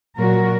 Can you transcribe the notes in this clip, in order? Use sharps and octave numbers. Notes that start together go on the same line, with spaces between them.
A#2 F#3 F#4 A#4